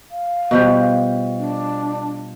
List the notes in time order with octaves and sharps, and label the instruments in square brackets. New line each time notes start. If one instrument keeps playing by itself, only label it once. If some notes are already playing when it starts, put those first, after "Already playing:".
[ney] F5
[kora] B2 F3 G3
[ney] D4